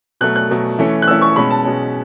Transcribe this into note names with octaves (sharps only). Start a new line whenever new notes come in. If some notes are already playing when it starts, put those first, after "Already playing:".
B2 F#3 A3 F#6
F#6
B2 F#3 A3
E3 A3 C#4 E4
F#6
E3 A3 C#4 E4 E6
C#6
B2 G#3 C#4 B5
A5
B2 G#3 C#4